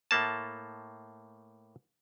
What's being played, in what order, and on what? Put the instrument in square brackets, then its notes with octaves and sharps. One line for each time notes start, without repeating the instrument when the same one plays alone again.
[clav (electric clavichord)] A2 A3 A#3 A5